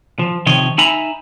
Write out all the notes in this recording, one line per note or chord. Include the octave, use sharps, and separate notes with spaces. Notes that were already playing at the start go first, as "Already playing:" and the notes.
F3
C3 D#3 F3 C#5 D#5
D#4 E5 G#5 A#5 B5